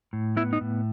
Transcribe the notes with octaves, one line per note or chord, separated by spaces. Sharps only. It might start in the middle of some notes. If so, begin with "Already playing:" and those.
A2
B3 E4
D#4
A2